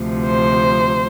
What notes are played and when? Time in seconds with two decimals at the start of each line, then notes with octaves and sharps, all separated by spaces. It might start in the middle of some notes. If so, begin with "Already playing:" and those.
Already playing: D2 C3 F3
0.26 C5